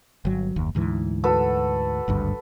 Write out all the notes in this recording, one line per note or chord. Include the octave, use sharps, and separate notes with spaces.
G1 F#3
F#1 D#2
D2 G#2 E3
F#4 A4 B4
G#1 D2 G2